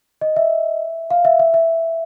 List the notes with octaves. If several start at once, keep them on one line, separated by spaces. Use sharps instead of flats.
D#5
E5
F5
E5
E5
E5